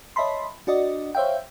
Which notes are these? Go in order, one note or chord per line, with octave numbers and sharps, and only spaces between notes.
C#5 D#5 E5 A5 B5 C6
D4 F#4 D5 D#5
C5 C#5 E5 F5 G5